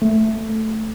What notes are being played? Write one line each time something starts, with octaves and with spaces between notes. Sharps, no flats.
A3